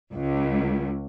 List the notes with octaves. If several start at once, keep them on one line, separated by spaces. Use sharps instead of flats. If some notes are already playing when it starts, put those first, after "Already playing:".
C#2